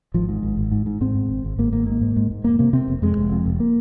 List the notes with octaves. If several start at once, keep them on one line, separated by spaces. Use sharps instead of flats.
G#1 F3
G#2
G#1
G#1
G#2
G#2
G#2 C4
G#2
G#1
G#1
G#1 A#3
G#1 A#3
G#2 A#3
G#2
G#2
G#2
F1 A#3
C3 A#3
C3 C4
F1
F2 G#3
F1
F2
F1
A#3